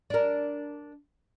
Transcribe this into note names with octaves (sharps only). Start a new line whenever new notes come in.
D4 A#4